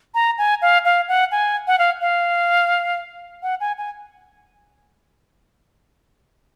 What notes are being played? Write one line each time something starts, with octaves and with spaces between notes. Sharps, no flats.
A#5
G#5
F5
F5
F#5
G#5
F#5
F5
F5
F#5
G#5
G#5